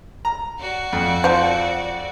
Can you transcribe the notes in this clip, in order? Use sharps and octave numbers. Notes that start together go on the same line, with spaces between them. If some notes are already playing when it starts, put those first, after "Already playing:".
A#5
F#4 D5
F2
F3